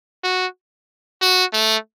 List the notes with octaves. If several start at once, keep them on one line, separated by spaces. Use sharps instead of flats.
F#4
F#4
A3